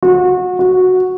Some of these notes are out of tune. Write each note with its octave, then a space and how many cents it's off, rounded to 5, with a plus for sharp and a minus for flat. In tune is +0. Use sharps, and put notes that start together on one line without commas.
F#4 -30
F#4 -5